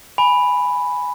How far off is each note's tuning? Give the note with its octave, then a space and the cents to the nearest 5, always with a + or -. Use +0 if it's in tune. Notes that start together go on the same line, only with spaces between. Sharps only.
G#5 +0 B5 +0